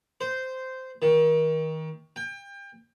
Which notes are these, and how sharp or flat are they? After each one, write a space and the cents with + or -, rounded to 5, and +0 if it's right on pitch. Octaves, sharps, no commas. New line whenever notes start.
C5 -10
D#3 +30
G5 +30